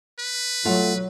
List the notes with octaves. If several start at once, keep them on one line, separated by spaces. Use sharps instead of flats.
B4
F#3 A3 F4 F#5